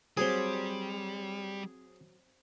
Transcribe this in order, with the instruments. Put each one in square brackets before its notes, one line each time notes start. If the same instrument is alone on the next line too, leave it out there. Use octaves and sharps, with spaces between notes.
[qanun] F#3 C4 [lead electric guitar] G3 [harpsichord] G#4